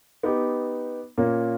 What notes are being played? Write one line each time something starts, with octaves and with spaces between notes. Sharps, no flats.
B3 D#4 G4
A#2 A#3 C#4